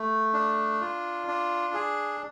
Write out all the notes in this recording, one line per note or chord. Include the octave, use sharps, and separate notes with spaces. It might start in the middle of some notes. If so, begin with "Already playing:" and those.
Already playing: A3
D4
F4
D4
G#4